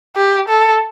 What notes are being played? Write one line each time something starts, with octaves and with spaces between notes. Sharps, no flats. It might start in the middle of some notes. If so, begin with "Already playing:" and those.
G4
A4